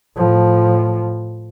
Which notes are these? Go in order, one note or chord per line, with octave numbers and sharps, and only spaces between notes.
A2 F3